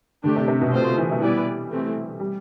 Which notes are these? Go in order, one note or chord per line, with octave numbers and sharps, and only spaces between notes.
D3 A3 D4 G4
C3
C3
B2
C3 A3 C4 F4 C5
E3
A3
G3 B3 E4 B4 D5
E3 A3 C4
G3